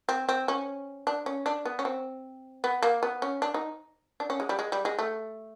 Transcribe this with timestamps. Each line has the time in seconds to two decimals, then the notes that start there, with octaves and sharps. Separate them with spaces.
0.09 C4
0.29 C4
0.48 C#4
1.07 D4
1.26 C#4
1.46 D4
1.65 B3
1.79 C#4
1.85 C4
2.64 B3
2.83 A#3
3.03 B3
3.22 C#4
3.42 D4
3.54 D#4
4.20 D4
4.30 C#4
4.40 G#3
4.49 G3
4.59 G#3
4.72 G3
4.85 G#3
4.99 A3